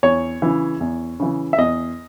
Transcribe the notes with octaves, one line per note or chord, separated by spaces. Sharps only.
E2 C#5
C#3 E3
E2
C#3 E3
E5
E2 D#5